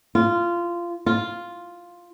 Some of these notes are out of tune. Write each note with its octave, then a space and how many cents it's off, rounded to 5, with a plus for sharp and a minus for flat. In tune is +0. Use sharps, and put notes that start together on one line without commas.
F4 -15
F4 +0